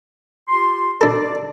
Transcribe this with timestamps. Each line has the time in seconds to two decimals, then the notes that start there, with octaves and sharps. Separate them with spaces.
0.49 F4 G4 C6
1.01 D4 A4 D5